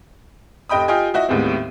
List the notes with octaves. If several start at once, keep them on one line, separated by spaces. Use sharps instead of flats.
F1 G4 D#5 G5 B5 D#6
F4 G4 D#5 G5 G#5
E4 F#4 D#5
D#2 A2 G#3 B3 C4